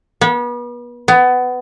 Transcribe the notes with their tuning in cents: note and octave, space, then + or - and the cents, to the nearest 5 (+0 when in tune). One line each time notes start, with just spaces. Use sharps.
B3 -35
B3 +20